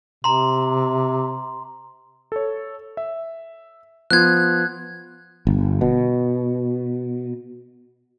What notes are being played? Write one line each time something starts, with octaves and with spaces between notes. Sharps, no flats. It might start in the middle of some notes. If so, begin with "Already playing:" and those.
C3 A#5 C6
A4 C#5
E5
F3 B3 F4 F#6 G#6
G1
B2